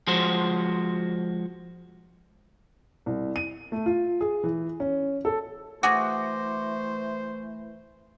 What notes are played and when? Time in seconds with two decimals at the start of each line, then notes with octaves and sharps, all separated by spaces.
0.07 F3 G#3 F#4 C5
3.06 C2
3.36 D#7
3.72 A3
3.86 F4
4.21 G#4
4.44 E3
4.80 C#4
5.25 A4
5.83 E3 A3 F#4 G#4 C5 D6 A#6